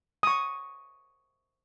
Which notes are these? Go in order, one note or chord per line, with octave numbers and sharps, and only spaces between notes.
C#6 D#6